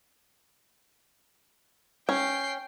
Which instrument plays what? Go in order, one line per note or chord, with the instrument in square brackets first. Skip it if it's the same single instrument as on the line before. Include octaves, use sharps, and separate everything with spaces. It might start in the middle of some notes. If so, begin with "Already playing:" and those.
[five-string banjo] C#4 [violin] G5 C7